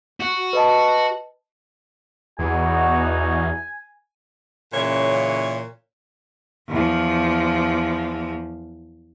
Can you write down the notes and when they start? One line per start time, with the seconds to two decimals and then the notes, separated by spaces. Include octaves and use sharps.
0.21 F#4
0.53 B4 D#5 A5
2.39 E2 B2 D#4 F#4 G#5
4.73 A#2 C#3 E3 C#4 C#5
6.69 E2 F3